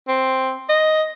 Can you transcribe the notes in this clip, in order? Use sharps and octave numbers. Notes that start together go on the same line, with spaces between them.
C4
D#5